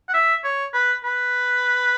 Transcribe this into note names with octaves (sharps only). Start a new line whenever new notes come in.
F#5
E5
C#5
B4
B4